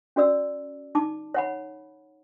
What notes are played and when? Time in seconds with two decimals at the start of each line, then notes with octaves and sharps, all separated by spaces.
0.16 C#4 F#4 D5 E6
0.95 D#4 A5 D6
1.34 C#5 F#5 B5